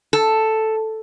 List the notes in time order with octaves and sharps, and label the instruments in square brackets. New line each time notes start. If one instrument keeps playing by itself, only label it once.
[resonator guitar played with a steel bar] A4